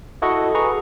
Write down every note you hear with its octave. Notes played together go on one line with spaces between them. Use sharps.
E4 F#4 A4 D#5 F#5 C#6
G#4 B4 A#5 C#6